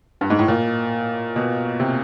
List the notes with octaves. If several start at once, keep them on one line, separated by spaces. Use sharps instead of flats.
G2
G#2
A2
A#2
B2
C3